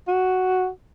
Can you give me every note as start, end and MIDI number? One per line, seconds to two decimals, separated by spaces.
0.08 0.68 66